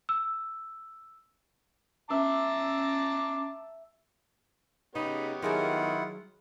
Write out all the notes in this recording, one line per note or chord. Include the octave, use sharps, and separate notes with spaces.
E6
C#4 E5 A5 A#5 D6
C#3 B3 D#4 G4 C#5 B5
D#3 F#3 E4 F4 G#4 A#4 F#5